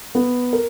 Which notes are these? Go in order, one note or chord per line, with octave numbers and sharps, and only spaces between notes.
B3
A#4